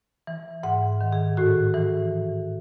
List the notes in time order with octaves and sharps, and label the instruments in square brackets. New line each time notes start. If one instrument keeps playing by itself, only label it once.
[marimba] E3
G#2 F#5
D#3
G#4
A2 F#4
E3